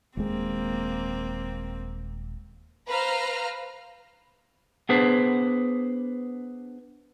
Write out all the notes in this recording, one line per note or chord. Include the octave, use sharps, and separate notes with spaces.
D#1 G#3 A#3 C4
B4 C5 F5 A#5 F6
B3 D4 G#4 B4 C5